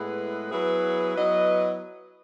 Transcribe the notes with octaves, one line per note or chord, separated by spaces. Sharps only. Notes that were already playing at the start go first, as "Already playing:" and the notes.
Already playing: A2 G#3 B3 E4 G#4 B4
F#3 B3 E4 G#4 B4
F#3 B3 E4 B4 D#5